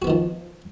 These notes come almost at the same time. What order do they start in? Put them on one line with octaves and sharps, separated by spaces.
F#4 B3 D#3 F3